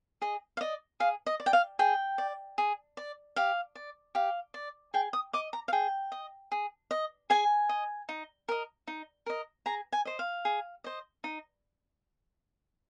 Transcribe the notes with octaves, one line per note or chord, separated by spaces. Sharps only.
G#4 D#5
F5
D5 D#5
G#4 F5
D#5
D5
G5
F5
G#4 G5
D5
G#4
D5
G4 F5
D5
G4 F5
D5
G#4 G5
D#6
D#5 D6
A#5
F5
G#4 G5
D#5
G#4
D#5
G#4 G#5
D#5
D#4
A#4 D#5
D#4
A#4 D#5
G#4 A#5
G#5
C5 D#5
F5
G#4
C5 D#5
D#4